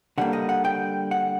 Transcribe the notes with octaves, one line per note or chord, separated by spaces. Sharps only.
D3 G3 A#3 F#5
D#5
F#5
G5
F#5